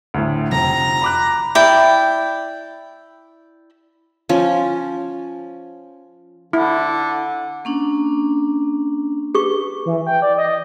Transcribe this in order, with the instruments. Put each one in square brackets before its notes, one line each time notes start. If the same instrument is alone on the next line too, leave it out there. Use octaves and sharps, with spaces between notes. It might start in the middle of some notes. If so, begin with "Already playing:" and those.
[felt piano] D2 A2
[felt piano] F1 [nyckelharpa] A#5
[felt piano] B5 D6 F#6
[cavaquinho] E4 D5 G5
[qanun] F3 C#4
[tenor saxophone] D3 [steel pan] E4
[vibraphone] A#3 C#4 D4
[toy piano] G4 G#4 C#6 [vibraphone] B4
[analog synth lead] E3
G5
D5
D#5